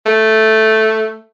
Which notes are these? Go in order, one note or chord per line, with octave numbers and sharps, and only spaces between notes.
A3